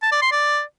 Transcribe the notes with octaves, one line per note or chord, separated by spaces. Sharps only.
A5
D5
C6
D5